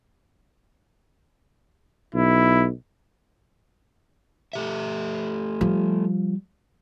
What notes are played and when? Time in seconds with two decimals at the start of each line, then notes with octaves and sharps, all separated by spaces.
2.14 B1 E4
4.53 A3 G4 E5
5.61 F3 G3